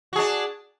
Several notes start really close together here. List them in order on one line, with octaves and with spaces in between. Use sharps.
F#4 G#4 D4